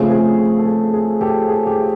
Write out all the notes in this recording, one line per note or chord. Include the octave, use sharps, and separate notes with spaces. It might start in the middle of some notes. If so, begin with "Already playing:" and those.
Already playing: C#3 F3 A3 C4 G#4
G#4
A4
G#4
G#4
G4 A4
G#4
G4